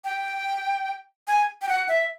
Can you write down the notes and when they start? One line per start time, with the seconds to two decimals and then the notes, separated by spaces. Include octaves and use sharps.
0.04 G5
1.28 G#5
1.62 G5
1.69 F#5
1.89 E5